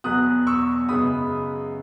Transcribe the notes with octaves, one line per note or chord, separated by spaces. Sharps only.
E2 B2 F#3 B3 D#6 F#6
C#6 E6
F#2 C#3 G#3 B3 B5 D#6